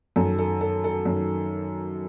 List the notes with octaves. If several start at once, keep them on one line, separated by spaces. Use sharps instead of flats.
F#2 D#3 A4
A4
A4
A4
F#2 D#3